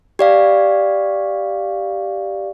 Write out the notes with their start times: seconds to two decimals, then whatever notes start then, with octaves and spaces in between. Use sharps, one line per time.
0.19 G4 D5 F5